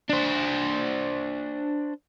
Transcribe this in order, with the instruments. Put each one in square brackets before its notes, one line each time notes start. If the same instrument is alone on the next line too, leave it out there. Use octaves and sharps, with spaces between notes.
[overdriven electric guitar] D4 C5